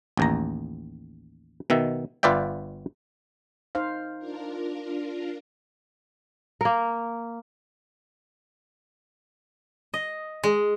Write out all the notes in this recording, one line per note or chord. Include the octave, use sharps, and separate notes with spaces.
A1 D#2 A#5
B2 D#3 E5
G1 F4 B4 D5 E5 G5
D#4 C5 F5
D4 F4 A#4
A#3 A#4
D#5
G#3